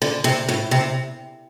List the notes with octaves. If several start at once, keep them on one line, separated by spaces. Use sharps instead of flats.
D3
C3
A2
C3